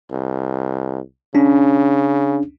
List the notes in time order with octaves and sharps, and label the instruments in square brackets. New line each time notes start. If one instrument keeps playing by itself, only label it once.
[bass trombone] C2
[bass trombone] C#3 [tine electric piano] C#4 D4